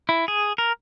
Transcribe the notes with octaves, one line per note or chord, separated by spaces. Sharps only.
E4
G#4
A#4